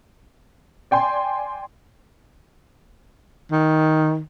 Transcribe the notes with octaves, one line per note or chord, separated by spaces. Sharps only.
D5 G5 G#5 C6
D#3